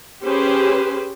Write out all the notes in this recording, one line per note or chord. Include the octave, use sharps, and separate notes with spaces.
C#4 G4 G#4 B4 C5